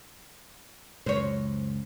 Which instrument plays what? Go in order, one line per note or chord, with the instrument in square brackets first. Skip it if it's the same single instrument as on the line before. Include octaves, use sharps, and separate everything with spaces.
[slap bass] C#2 F#2 [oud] C5 C#5